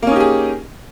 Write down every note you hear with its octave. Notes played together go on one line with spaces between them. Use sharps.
A#3 C#4 D#4 G4 G#4